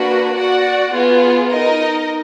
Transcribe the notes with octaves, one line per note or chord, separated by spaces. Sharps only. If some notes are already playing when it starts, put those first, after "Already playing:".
Already playing: A#3 D4 F#4 B4
F#4 D5 F#5
B3 F4 G#4
D#4 A#4 D#5